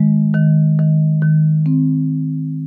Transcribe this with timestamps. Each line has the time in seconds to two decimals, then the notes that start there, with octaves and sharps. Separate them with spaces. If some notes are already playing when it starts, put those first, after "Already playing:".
Already playing: D#3 G#3
0.34 D#3
0.79 D#3
1.22 D#3
1.66 C4